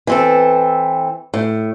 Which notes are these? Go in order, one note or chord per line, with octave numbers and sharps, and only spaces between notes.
E3 C4 A4
A2